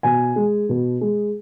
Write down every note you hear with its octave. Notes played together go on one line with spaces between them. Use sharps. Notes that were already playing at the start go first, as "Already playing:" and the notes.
B2 G#5
G#3
B2
G#3